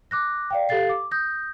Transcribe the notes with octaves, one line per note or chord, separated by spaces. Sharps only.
D6 F#6 A#6
D5 F5 G5
G4 A4 F5 A6 C7
D6
D#6 G6 A#6